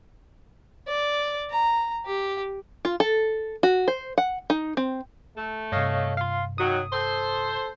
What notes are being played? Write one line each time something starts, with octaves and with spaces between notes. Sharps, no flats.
D5
A#5
G4
F4
A4
F#4
C5
F#5
D#4
C4
A3
G2 C3 C#5 D#5 F5
F5 C6
D#3 F#3 D#6
A4 C5